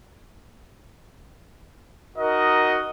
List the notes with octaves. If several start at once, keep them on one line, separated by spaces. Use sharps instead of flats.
D#4 F#4 A#4 D#5